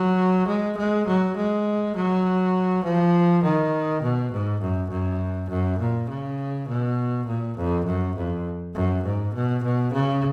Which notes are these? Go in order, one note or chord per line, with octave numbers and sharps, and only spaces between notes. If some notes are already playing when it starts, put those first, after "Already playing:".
Already playing: F#3
G#3
G#3
F#3
G#3
F#3
F3
D#3
B2
G#2
F#2
F#2
F#2
A#2
C#3
B2
A#2
F2
F#2
F2
F#2
G#2
B2
B2
C#3